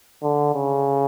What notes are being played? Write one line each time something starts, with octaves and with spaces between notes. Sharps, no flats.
D3
C#3